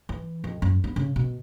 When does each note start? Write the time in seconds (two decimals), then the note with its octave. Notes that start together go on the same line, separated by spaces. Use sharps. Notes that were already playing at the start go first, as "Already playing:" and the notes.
0.09 E3
0.44 F2
0.62 F#2
0.84 B3
0.96 C#3
1.16 B2